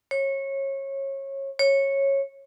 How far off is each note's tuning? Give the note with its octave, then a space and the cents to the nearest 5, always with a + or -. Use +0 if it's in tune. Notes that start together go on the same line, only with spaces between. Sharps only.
C#5 -25
C#5 -15